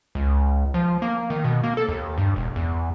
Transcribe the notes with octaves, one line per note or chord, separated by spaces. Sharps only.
C#2
F3
A#3
D#3
B2
A#3
A4
D#2
G2
E1
E2